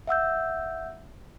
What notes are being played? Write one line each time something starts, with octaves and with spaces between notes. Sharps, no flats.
E5 F#5 E6 G6